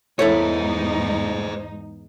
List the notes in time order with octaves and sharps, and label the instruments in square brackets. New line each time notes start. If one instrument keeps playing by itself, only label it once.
[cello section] E2 G#2 D#4 [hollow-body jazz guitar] E4 A4 C#5 [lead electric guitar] C5 D#5